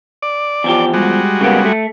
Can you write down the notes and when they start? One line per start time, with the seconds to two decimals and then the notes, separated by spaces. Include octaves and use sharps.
0.22 D5
0.64 E2 F3 G4
0.94 G3 G#3 F#4
1.41 C#3 A#3 B3
1.65 A3